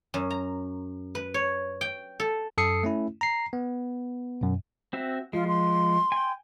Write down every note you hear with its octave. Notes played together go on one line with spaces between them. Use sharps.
F#2
A#5
B4
C#5
G5
A4
F#2 A4 D#6 C7 C#7
A3 C#4 E4
A#5 C7
B3
F#2 B2
C4 F#4 E5
F3 G#3 F4
C6
G5 G#5